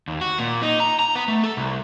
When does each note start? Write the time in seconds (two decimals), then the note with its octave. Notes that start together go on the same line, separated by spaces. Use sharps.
0.08 D#2
0.21 F#4
0.39 A#2
0.63 D#4
0.80 A#5
0.99 A#5
1.15 B3
1.28 A3
1.43 A4
1.57 C2